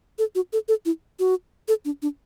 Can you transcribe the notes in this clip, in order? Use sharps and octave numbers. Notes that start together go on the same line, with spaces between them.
A4
F#4
A4
A4
E4
F#4
A4
D4
D4